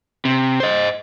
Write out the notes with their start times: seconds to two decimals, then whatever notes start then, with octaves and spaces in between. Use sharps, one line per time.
0.25 C3
0.60 C5 D#5